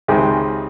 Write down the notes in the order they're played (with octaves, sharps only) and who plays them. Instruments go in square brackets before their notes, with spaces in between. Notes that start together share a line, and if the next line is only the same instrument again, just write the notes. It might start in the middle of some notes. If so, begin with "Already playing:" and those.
[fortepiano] C#2 C3 D#3 G#3 C4